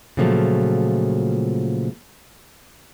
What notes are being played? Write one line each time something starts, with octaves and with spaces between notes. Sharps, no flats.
A#2 C#3 F3 F#3 A3